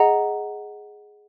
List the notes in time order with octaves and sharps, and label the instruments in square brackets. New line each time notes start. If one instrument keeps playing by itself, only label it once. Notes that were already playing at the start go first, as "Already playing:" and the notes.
Already playing: [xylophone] G#4 D#5 F#5 A#5